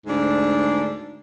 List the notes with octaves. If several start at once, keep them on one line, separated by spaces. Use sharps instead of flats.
D2 G#2 D4